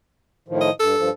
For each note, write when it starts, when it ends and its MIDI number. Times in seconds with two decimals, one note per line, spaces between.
0.48 0.70 45
0.48 0.70 51
0.48 0.70 53
0.61 0.73 75
0.80 0.95 43
0.80 1.10 69
0.97 1.10 43
0.97 1.10 53